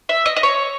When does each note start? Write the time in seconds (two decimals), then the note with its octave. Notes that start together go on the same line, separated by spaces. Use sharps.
0.09 E5
0.26 D#5
0.36 D#5
0.43 C#5